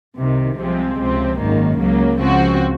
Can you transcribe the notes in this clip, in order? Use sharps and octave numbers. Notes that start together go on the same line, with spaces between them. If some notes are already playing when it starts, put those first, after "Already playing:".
C2 C3 D#3
C2 C3 F3 G#3 C4
C#2 C3 F3 C4
G#1 F#2 D#3 A#3
C#2 C#3 F#3 A#3
C#2 C#3 F3 C4 F#4